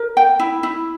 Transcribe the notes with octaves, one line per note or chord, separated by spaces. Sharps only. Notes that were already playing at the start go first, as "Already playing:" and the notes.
Already playing: A#4
G5
E4
E4